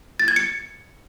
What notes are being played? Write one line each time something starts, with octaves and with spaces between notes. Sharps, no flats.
A6
G#6
C#7